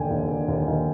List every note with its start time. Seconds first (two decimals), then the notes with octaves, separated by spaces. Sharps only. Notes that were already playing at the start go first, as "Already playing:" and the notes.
Already playing: D#2 D3 G5 G#5
0.10 D#2
0.28 D3
0.48 D#2
0.67 D#2